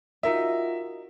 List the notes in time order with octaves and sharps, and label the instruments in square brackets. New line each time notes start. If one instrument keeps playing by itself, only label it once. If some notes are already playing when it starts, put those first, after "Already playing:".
[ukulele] D#4 A#4 D#5 [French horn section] F4 F#4 [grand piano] E5